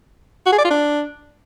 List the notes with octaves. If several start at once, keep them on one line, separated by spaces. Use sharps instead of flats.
F#4
G#4
D5
F4
D4